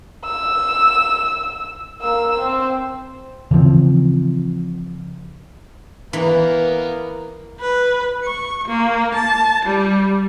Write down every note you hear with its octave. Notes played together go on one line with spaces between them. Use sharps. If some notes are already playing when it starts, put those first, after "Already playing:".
E6
A#3 E6
C4
C#3 E3 F3 C4
E3 A#3 B3 A#4
B4
C#6
A#3
A5
G3